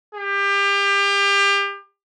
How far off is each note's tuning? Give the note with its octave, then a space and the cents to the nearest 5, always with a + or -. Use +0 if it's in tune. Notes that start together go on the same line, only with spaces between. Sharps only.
G4 +30